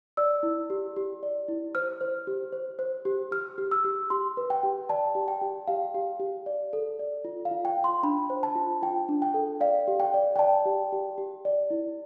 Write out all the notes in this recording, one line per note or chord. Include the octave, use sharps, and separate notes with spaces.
D5 E6
E4
G4
G4
D5
E4
C5 F6
C5
G4
C5
C5
G4
G4 F6
G4
E6
G4
G4 C6
B4
G5
G4
D5 A5
G4
G5
G4
G4 F5
G4
G4
D5
A4
D5
F4
F5
F4
G5
F4
C6
D4 B5
C5
A5
F4
F4 G5
D4
G5
A4
D5 F5
G4
G5
D5
G5
D5 A5
G4
G4
G4
D5
E4